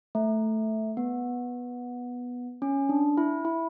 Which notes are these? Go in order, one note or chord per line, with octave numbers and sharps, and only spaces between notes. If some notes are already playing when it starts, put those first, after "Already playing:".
A3
B3
C#4
D4
E4
E4